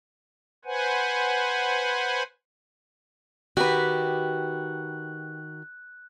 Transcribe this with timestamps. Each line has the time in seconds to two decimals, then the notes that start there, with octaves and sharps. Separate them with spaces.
0.65 B4 C5 F#5 G#5
3.57 D#3 F#4 G4 B4 F#6